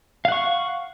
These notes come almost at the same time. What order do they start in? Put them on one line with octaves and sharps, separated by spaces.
F5 F#5 C#6